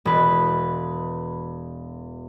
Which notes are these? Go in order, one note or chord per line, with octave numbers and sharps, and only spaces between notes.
E1 B4